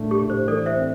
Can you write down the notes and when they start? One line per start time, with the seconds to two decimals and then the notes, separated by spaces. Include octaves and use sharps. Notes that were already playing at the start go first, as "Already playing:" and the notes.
Already playing: A2 A3 D4
0.11 G4
0.21 A2
0.30 C5
0.48 E3 A4 D5
0.66 C5 E5
0.76 C4